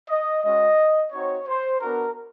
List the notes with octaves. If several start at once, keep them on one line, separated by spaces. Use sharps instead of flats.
D#5
G#3 C#4 F#4 D#5
C4 D#4 F#4 C#5
C5
B3 D4 F#4 A#4